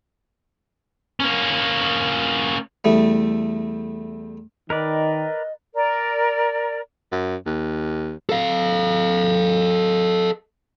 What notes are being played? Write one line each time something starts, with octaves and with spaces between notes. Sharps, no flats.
A#3 C#4
E2 G3 A3
D#3 A#4 B4 D5 D#5
A#4 D5
F#2
D#2
A4 F5